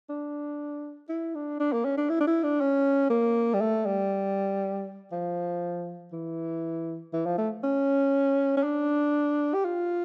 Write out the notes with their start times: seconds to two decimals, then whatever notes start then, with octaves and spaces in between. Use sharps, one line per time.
0.09 D4
1.09 E4
1.35 D4
1.60 D4
1.73 A#3
1.85 C#4
1.97 D4
2.09 E4
2.20 D4
2.27 E4
2.43 D4
2.61 C#4
3.10 A#3
3.54 G3
3.61 A3
3.86 G3
5.12 F3
6.12 E3
7.13 E3
7.26 F3
7.38 A3
7.63 C#4
8.57 C#4
8.63 D4
9.54 G4
9.65 F4